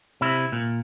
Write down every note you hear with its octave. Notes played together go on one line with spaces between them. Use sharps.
C3 E4
A#2